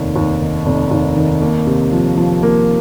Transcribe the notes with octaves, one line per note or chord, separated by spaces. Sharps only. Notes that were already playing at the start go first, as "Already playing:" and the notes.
Already playing: F1 D#2 D#3
D#2
D#3
F1
D#2
D#3
A#3
C3
F3
F3
A#3